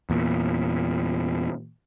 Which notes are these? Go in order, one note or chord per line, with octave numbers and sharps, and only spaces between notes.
E2 A#2